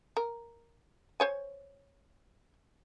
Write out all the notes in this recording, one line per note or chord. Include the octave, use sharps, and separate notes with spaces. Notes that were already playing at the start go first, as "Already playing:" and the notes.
A#4
C5 C#5 G#5